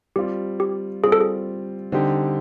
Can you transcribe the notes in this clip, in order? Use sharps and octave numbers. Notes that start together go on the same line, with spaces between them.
G3 C4 F4 G4
G4
G3 C4 F4 G#4
A4
G#4
D3 G3 C4 D#4 G4